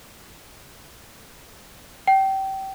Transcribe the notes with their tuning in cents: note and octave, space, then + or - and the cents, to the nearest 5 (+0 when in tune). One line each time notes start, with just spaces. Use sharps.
G5 -25